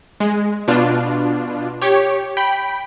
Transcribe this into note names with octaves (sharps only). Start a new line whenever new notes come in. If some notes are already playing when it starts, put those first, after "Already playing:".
G#3
B2 D4 F4
G4 C#5
G5 B5